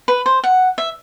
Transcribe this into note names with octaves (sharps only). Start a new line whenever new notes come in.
B4
C5
F#5
E5